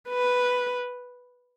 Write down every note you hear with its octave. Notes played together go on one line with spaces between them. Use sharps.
B4